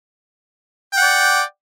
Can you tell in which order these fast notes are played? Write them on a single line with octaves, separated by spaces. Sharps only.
G5 F#5 D5